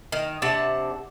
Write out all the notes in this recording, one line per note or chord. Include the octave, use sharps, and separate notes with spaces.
D#3
C3 D4 F#5 A5